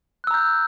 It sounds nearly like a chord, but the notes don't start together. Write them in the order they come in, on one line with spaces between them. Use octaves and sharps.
F#6 E6 A#5 G6